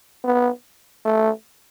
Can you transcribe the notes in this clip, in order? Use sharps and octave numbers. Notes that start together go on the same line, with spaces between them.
B3
A3